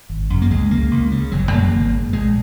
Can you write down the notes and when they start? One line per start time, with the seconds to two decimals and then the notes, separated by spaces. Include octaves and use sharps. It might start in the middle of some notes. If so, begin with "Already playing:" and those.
0.09 G#1
0.30 F#2 C#3
0.42 A#3
0.51 C#2 G#3
0.71 C#3 A#3
0.91 C#2
1.11 C#3
1.31 F#1 F#3
1.52 F#2 C#3 A#3
1.72 G#1
1.93 G#2
2.12 A#1 G#3